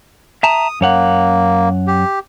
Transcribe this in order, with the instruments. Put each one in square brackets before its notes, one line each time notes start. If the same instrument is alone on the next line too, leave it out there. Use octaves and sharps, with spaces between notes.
[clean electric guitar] E5 A5 A#5 [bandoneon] D#6
[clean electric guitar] F#2 C#5 F#5 [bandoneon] A#3
[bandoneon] G4